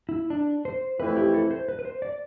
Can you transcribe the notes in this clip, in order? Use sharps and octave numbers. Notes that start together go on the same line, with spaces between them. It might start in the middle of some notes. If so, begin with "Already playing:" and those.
E4
D4
C5
F2 E3 A3 C4 E4 B4
G4
A4
C5
B4
B4
C5
D5